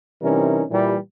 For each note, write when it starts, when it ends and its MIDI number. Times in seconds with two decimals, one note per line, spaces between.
0.23 0.62 48
0.23 0.62 52
0.23 0.62 55
0.23 0.62 61
0.23 0.62 63
0.23 0.62 70
0.70 0.96 46
0.70 0.96 52
0.70 0.96 55